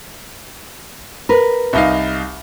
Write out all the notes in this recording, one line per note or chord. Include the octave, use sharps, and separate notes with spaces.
A#4 B4
C2 D#4 F5